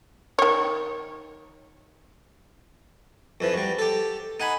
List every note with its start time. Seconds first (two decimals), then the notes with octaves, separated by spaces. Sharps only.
0.39 D#3 C#5
3.41 F2 E3 F3
3.54 F#3 G3
3.79 G4 A4
4.40 D#4 F#5 G#5 B5